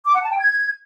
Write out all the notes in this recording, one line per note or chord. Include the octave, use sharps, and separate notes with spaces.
D6
F#5
A5
G5
G#6